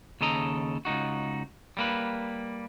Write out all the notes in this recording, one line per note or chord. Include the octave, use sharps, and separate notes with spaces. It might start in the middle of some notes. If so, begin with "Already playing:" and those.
D#2 C#3 A4 D#5 A#5
C#2 G#2 D#4 F#4
G3 A#3 B4